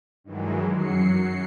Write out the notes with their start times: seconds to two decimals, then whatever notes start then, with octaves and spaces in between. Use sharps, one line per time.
0.24 G2 D#3 E3 F#3 G#3
0.74 F#2 F#3 C7 C#7